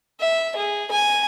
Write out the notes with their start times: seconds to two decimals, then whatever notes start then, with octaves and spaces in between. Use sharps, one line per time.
0.21 E5
0.56 G#4
0.91 G#5